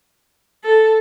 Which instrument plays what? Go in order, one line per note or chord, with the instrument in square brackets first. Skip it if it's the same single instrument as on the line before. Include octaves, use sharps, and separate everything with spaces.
[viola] A4